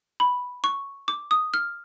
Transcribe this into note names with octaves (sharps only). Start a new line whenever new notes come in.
B5
C#6
D6
D#6
F6